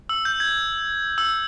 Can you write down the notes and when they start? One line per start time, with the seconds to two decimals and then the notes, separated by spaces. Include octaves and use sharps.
0.09 E6
0.25 G6
0.40 G#6
1.18 E6